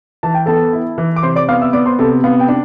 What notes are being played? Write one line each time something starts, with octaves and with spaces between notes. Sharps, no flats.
E3 A5
G5
B3 A4 A5
E4
E3
D6
C3 C5 C6
D5 D6
B3 F5 F6
E5 E6
B3 D5 D6
C5 C6
C3 A4 A5
B3 F5
G5
D4